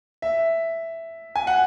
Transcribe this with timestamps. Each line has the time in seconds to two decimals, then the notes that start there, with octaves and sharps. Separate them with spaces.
0.22 E5
1.36 G#5
1.47 F#5